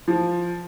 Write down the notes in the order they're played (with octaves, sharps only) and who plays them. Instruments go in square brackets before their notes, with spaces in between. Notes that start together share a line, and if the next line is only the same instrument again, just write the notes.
[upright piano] F3